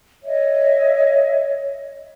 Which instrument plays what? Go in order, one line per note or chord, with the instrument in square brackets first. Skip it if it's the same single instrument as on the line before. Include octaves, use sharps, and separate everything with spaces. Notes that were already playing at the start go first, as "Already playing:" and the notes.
[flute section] C#5 D#5 E5